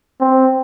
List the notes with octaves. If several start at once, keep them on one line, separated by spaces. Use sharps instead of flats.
C4